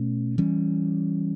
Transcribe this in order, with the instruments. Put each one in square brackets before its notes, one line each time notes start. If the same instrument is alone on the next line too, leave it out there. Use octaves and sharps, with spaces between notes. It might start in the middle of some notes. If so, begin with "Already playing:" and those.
Already playing: [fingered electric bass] B2 A3 C#4
E3 G3 C#4